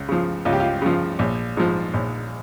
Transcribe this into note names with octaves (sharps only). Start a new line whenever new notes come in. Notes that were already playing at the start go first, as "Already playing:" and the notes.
Already playing: C#2
C#3 F3
C#2 F4
G4
F4
C#3 F3
A#1
G#2 F3
A#1